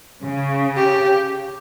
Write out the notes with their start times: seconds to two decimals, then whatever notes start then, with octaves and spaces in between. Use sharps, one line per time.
0.23 C#3
0.77 G4